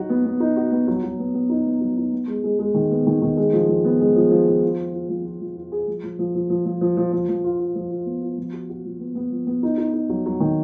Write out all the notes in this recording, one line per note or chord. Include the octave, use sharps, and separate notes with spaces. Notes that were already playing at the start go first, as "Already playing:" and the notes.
Already playing: F#3 D#4 F#4
B3
B3
D#4
F#4
B3
F#3
F#3
B3
B3
D#4
B3
F#3
D#4
B3
G#3
G#3
G#3
D#3
B3
D#3
D#3
G#3
F3
F3
B3
G#3
F3
F3
F3
F4
F4
F4
F3
F4
F3
F4
G#4
F3
F3
F3
F3
F3
F3
F3
F3
F3
F3
F4
F4
F3
F4
B3
F4
F3
F#4
F#4
F3
B3
B3
F3
B3
D#4
D#4
D#4
F#3
F#3
D#3